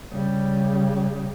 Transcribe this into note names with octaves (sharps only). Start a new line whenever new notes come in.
C#3 G3